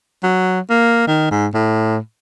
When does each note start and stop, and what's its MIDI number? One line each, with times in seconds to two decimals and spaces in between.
0.23 0.60 54
0.70 1.07 58
1.07 1.29 51
1.31 1.47 44
1.54 1.97 45